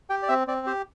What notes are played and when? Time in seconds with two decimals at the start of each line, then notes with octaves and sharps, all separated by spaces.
0.10 G4 G5
0.23 D5
0.28 C4 E5
0.47 C4 D5
0.67 G4 C5